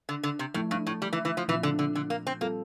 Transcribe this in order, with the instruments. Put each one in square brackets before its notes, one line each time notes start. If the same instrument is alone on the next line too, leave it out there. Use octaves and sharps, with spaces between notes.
[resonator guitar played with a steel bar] D3
D3
C3
[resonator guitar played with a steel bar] A2 [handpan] F3 A3 E4
[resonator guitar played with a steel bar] G2
A2
G3
E3
E3
F3
[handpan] A#2 F3 C4 F4 [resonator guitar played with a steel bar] E3
[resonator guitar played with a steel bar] D3
D3
D3
A#3
C4
[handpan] G3 C4 F4 A4 [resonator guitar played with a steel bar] A#3